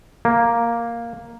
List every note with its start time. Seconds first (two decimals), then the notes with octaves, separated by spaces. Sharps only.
0.25 A#3